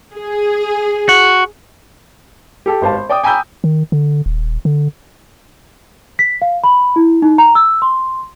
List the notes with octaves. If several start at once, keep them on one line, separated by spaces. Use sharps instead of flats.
G#4
F#4
G4 A4 G5
G#1 G4 C5 F5 A5
C5
D5 G5 D6 D#6
G5 G#5 A#5 B5 E6 G6
D#3
D3
D#1
D3
B6
F5
B5
E4
D#4
A#5
E6
C6